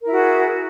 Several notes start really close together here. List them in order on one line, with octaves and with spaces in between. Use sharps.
A#4 E4 F#4 G#4